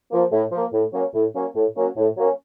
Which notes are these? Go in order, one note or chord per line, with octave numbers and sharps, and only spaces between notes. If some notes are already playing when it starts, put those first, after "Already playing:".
F3 A#3
A2
F3 A#3
A2
F#3 A#3 C#4
A2
F#3 A#3 C#4
A2
F#3 A#3 C#4
A2
F#3 A#3 C#4